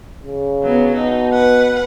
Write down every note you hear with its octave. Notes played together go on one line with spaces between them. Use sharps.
C#3
F#3 B3
B2 D#4
B4 F#5